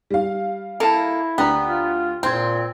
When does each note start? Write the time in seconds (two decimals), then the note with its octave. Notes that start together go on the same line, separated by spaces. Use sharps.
0.10 G3 F5
0.80 A#3 E4 A4 A5
1.38 D2 B3 G4 D5 A#5
1.65 F4
2.23 A#2 C4 C6 G#6